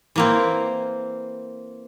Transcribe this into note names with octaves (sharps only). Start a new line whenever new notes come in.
E3 A#3 C4